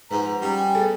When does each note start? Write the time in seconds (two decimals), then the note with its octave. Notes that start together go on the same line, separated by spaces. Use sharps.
0.11 G#2 F3 B4 F#5 A#5
0.42 G3 C#4
0.58 G5 G#5
0.75 B3 G#4 A4